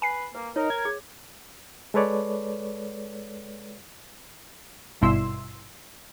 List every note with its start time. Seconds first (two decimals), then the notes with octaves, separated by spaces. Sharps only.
0.02 B4 G#5 C7
0.35 A#3 B4
0.56 D#4 A#4 C#5
0.70 G#6
0.85 G#4
1.94 G#3 A4 B4 C#5 D5
5.01 G#1 G2 B2 E4 C6 E6